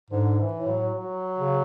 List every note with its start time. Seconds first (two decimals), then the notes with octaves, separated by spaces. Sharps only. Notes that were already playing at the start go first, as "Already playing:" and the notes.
0.10 G#2 D3
0.39 E3
0.54 A2
0.67 F#3
0.96 F#3
1.38 C#3